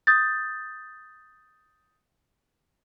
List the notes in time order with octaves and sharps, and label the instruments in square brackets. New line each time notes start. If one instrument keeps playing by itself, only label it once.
[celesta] D#6 G6 A6